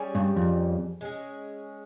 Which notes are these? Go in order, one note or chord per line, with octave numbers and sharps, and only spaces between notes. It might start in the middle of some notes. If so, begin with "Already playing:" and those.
Already playing: G3 C#4 G#4
G2
F2
G#3 C#4 G#4